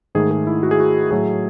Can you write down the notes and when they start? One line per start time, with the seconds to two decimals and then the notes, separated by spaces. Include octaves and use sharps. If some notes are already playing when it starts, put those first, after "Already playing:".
0.15 G#2 D#3 A3 G#4
0.31 G#4
0.47 E4
0.63 F#4
0.71 G#4
0.80 F#4
1.11 A2 F#3 A3 G#4